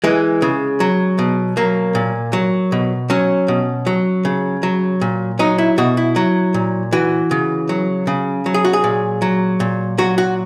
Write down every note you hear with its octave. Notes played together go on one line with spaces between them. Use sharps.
E3 G#3
C#3
F#3
B2
F#3 A#3
A#2
F#3
B2
F#3 C#4
B2
F#3
C#3
F#3
A#2
F#3 D#4
E4
B2 F#4
E4
F#3
A#2
E3 F#4
C#3
F#3
C#3
F#3
G#4
F#4
G#4
A#2
F#3
A#2
F#3 F#4
F#4